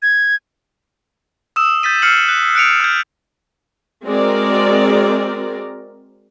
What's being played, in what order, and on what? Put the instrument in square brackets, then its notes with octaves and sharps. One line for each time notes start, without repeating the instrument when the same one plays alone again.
[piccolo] G#6
[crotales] D#6 E6 E7
G6 A6 B6 D#7
E6 F6 C7 C#7 F#7
F#6
F#6 C#7 D7 F7
F6 G6
[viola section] G#3 C4 F#4 A#4 D5